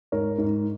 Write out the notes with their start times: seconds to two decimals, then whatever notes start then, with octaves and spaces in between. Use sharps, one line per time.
0.12 G#2 A#4 C#5
0.38 G#2